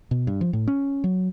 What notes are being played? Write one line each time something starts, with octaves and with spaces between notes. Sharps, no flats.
B2
G2
F3
A2
C#4
F#3